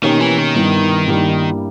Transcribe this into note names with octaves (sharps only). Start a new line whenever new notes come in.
B2 D#3 A#3 C#4 G4
E3
D#3
G2 G3 B3 E4
G2 G3 A#3 E4 G4